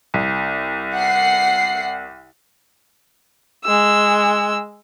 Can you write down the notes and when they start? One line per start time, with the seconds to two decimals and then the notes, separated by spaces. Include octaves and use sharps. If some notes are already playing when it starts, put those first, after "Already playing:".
0.14 C2
0.94 F#5 C7
3.65 G#3 E6